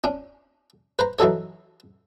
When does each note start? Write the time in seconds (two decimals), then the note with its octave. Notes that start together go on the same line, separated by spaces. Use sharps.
0.04 C#4 D4
0.99 B4 C5 A#5
1.19 E3 F#3 D#4 A4 C#5